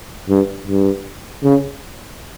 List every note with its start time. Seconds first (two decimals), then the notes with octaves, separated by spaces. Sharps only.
0.29 G2
0.67 G2
1.43 C#3